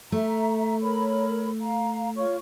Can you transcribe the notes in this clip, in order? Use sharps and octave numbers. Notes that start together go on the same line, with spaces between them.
A3 E5 A#5
A#4 C#5 B5
F5 A#5
F4 C#5 C#6